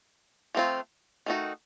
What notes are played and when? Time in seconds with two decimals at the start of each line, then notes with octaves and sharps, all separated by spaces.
0.55 F3 A3 C4 F4
1.26 D#3 A3 D#4 F#4